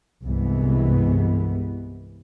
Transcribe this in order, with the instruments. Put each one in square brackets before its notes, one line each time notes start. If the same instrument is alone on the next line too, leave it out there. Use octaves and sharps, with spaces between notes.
[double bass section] C2 G2 C3 E3 G#3 B3